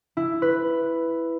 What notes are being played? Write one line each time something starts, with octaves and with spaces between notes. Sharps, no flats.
E4
B4